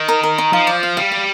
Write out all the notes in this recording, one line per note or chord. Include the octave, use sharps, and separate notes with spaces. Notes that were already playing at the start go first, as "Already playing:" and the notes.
Already playing: D#3
A#4
A#4
D#4
F3 F5
D5
F5
G3 F5
F5